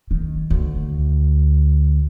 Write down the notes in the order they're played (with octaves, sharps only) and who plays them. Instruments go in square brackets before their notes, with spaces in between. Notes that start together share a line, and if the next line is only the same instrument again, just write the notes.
[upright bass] D#3
D2